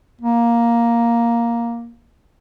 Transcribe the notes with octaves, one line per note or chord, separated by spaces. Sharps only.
A#3